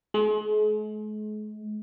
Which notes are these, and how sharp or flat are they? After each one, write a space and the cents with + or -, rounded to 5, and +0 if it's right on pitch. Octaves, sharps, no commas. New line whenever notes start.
G#3 +40